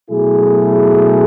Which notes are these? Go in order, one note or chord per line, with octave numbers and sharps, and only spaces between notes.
B2 F#3 A3 E4 G#4